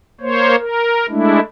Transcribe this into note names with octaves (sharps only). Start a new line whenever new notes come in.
A#3 C5 C#5
A#4
G#3 A3 D4 E4